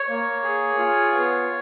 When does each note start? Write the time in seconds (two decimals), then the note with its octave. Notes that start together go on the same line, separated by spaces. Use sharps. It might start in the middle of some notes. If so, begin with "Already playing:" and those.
Already playing: C#5
0.09 A#3
0.43 G#4
0.78 F4
1.12 B3